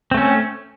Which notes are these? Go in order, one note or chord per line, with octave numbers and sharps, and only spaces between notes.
A3 C4 C#4